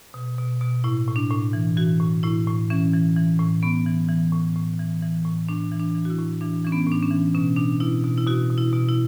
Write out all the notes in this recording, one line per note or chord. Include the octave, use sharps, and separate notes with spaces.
B2
B2
B2
A2 E4
A2
D4
A2
E3
E3 F#4
A2
A2 E4
A2
E3 C#4
E3
E3
A2
A2 B3
E3
E3
A2
A2
E3
E3
A2
A2 D4
E3
D4
E3
F#4
E4
A2
E3 D4
E3 C#4
B3
A2 D4
C#4
E3
B2 C#4
B2 D4
B2 E4
B2
E4
B2 F#4
B2
E4
B2
E4